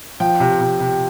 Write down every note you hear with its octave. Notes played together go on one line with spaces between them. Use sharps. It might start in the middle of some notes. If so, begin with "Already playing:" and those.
F3 G5
C3
C3
C3